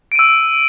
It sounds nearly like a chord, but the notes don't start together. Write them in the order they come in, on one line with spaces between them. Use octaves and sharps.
D7 D#7 E6